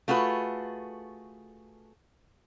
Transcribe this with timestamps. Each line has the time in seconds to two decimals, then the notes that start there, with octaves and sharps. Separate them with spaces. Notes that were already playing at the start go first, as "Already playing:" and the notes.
0.08 A3 F4 F#4 G#4 B4